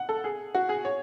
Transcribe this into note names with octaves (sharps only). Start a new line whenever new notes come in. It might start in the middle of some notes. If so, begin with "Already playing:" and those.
Already playing: F#5
A4
G#4
F#4
G#4
C#5